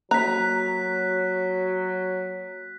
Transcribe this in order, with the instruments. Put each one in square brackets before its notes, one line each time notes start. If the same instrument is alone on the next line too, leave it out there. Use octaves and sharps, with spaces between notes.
[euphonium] F#3 [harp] A#3 [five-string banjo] A#5 [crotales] F#6 B6